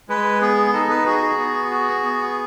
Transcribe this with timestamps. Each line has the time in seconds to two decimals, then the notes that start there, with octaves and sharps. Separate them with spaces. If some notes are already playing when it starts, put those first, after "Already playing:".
0.09 G#3 B4
0.41 B3 G#4
0.73 D#4 A4
0.90 B4
1.06 F#4 G#4
1.22 G#4
1.38 B3
1.71 F#4
2.03 B3